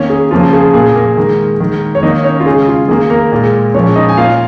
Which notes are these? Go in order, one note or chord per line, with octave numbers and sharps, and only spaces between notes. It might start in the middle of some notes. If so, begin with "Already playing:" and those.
Already playing: D#3 A#3 C#4 C#5
G#4
C#3 F3 A#3 F4
G#4
A#2 A#3 G#4
A#3 A#4
D#3 G#3
D#3 G#3
C#5
D#3 A#3 D#4 D#5
C#4 C#5
F4
C#3 G#3 G#4
F4
D#3 A#3 G#4
A#3 A#4
A#2 G#3
A#2 F3 G#3 C#4 C#5
D#4 D#5
G#5
A#2 A#3 F4 F5